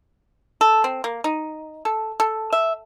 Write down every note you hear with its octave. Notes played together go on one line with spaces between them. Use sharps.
A4
C4
A#3
D#4
A4
A4
E5